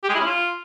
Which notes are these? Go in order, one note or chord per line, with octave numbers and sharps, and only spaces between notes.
G4
G#3
E4
C#4
F4